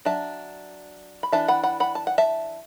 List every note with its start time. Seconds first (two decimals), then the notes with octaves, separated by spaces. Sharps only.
0.05 F#3 D4 E5 A5
1.23 B5
1.32 E3 D4 E5 A5
1.48 F#5 B5
1.63 F#5 B5
1.80 F#5 B5
1.95 A5
2.07 F#5
2.18 E5 A5